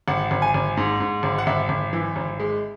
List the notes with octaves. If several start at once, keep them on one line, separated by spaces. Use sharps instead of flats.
G#1 F#5
G#1
G#5
G#1
G#2
G#2
G#1
F#5
G#1 E5
G#1
E3
G#1
G#3